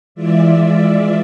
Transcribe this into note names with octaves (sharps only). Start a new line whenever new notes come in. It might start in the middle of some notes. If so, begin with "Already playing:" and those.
E3 G#3 F4 D5 E5